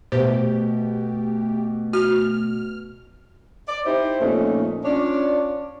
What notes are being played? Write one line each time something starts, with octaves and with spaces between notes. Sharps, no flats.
B2 A3 G4 C5
F#4 F6
D5
D#4 E4 G4 C5
F2 A#2 A3 C#4 D#4
C#4 D4 F4 C#5 D5